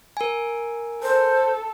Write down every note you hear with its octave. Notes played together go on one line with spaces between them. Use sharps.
A#4 G#5
A4 C5